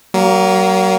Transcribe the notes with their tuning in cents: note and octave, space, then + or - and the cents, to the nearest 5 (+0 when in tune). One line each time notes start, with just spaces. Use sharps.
F#3 +35 A#3 +0